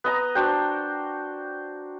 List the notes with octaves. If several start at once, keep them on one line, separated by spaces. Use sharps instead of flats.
B3 D#5 A#5
D4 F#4 C5 G5